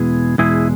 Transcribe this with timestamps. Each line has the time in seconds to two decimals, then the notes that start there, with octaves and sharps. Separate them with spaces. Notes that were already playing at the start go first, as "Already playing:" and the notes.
Already playing: E2 B2 G#3 E4 G#4
0.38 E2 B2 G#3 E4 G#4